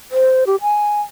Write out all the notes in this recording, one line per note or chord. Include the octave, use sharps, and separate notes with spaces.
C5
G4
G#5